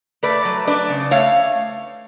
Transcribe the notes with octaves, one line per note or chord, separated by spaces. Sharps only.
A3 B4 D5
F#3
D4 B4 D5
C#3
A3 C#5 F5